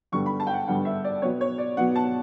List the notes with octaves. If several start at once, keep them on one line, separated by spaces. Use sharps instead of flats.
G2 D3 G3 B3 C#6
B5
A5
G5
F#5
G2 D3 G3 B3 F#5
E5
D5
B2 F#3 B3 C#5
C#5
D5
B2 F#3 B3 F#5
A5